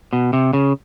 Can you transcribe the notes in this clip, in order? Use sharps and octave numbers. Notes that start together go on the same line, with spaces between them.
B2
C3
C#3